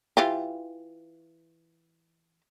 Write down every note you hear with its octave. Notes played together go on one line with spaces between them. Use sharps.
E3 F4 G4